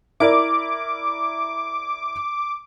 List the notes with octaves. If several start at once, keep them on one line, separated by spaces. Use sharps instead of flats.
E4 A#4 D5 D6